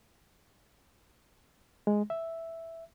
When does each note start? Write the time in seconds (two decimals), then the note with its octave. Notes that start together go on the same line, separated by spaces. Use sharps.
1.87 G#3
2.10 E5